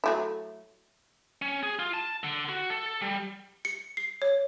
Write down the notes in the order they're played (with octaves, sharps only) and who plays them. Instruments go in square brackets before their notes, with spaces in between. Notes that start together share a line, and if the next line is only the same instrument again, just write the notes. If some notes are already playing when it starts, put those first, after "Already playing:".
[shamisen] F#3 A3 E4
[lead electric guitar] C#4
G#4
F4
A5
D3
F#4
A4
G3
[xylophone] C#7
C7
C#5